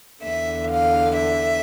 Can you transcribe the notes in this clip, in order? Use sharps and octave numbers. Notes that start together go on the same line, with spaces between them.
E2 D3 E5
F5
E5